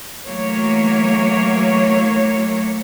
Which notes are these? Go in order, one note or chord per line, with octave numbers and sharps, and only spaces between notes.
E3 F#3 A3 A#3 C#5